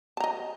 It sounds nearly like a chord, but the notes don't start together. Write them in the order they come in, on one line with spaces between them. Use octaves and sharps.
A5 A#5 D#5